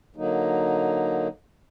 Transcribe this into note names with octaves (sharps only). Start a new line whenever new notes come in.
D3 F#3 A#3 D#4